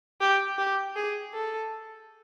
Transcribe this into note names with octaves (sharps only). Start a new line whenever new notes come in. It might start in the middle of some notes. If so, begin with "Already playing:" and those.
G4
G4
G#4
A4